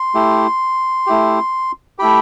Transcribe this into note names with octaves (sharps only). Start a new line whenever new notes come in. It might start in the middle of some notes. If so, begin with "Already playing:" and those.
Already playing: C6
A3 E4 G4
A3 E4 G4
A3 E4 G4 B5